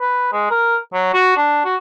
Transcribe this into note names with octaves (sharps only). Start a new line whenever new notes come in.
B4
G#3
A#4
F#3
F#4
D4
F#4